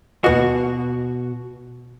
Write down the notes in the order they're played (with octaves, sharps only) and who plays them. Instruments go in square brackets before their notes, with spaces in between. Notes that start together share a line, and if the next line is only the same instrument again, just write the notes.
[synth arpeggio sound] D#2 B4 D#5 [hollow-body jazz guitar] B2 F#4